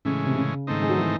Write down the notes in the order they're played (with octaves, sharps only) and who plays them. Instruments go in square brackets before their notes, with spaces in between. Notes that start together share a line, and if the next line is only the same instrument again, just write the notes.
[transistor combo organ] A2 E3 G#3 C#4 [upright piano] C#3
[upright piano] C3
C#3
[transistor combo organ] G#2 D#3 A3 C4 D#4
[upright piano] G#3
F#3
E3